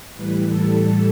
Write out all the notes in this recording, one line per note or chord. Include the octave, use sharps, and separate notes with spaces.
A2 E3 G3 B4
A4